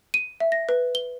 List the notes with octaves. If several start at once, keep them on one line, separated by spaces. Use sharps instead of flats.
D#7
E5
A#6
B4
G7